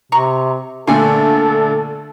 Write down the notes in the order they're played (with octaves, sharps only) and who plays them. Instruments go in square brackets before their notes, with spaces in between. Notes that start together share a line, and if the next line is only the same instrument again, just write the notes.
[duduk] C3 [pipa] A#5 C#6
[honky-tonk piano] A#2 D3 A3 [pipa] F4 G#5 [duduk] A4